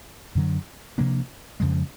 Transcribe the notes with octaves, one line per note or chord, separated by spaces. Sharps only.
F#2 D3 F#3
C3 F3 A#3 D4
F2 C#3 F3 G#3